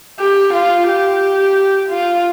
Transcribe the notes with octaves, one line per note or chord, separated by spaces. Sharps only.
G4
F4
G4
F4